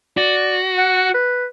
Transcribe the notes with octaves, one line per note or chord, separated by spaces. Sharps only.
F#4 D5
F#5
B4